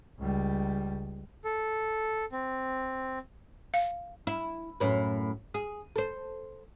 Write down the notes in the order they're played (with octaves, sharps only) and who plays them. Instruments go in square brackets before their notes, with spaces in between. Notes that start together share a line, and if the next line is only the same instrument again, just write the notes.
[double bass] C#2 G3
[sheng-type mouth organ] A4
C4
[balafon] F5
[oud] E4
F#2 A2 B4
G#4
A4 C5